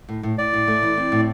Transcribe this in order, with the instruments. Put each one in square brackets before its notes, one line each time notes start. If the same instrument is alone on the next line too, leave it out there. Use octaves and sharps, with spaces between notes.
[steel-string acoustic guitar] A2
A2
[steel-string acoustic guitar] A2 [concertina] D5
[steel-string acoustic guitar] A2
A3
E3
C4
A2